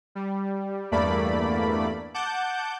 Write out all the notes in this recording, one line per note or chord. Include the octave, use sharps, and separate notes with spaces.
G3
E2 G2 A3 A#3 D5 B5
F#5 A5 D6 G6